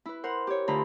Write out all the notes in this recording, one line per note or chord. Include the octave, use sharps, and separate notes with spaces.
E4 B4
A#4 C5 F#5
G4 C#5
D2 D3 F4 A#5 B5